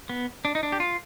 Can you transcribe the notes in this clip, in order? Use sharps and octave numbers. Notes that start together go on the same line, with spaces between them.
B3
D4
D#4
D4
G4
F4